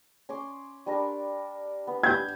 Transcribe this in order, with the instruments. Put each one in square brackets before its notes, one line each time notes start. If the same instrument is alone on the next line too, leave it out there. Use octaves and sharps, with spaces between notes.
[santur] C#4 C6 D6
G3 D4 A#4
B3
[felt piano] G6 G#6